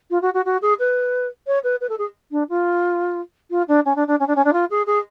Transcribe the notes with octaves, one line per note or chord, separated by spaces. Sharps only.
F4
F#4
F#4
F#4
G#4
B4
C#5
B4
B4
A4
G#4
D4
F4
F4
D4
C#4
D4
D4
C#4
D4
C#4
D4
F4
G#4
G#4